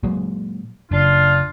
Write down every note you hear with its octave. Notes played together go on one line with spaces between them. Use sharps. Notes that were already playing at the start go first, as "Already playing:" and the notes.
A#2 F#3 G#3
F#1 D4 F4